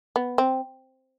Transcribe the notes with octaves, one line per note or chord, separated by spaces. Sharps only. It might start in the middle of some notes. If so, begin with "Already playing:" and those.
B3
C4